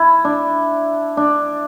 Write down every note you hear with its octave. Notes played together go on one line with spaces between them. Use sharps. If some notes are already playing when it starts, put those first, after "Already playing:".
Already playing: E4
D4
D4